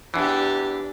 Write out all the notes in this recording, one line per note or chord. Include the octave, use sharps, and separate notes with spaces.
E2 E3 D4 G4